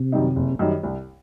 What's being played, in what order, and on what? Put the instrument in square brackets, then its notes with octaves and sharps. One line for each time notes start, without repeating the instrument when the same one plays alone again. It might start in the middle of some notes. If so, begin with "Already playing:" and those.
Already playing: [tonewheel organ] C3
[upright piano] F#2 D#3 G3 D#4
F#1
F#2 D#3 G3 D#4
C2